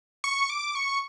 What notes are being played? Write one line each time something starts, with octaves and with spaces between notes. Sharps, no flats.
C#6
D6
C#6